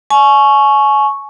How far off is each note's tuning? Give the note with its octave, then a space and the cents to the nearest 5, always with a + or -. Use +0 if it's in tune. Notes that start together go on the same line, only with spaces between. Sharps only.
G#5 +35 C#6 +0